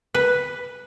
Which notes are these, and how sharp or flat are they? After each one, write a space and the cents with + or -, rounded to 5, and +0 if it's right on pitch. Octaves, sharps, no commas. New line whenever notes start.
B4 +0